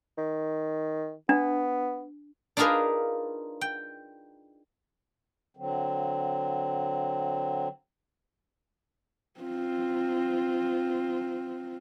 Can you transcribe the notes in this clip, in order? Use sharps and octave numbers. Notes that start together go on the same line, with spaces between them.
D#3
B3 D4
D4 D#4 F4 G#4 A#4 B4
G5
D3 F#3 C4
C4 F4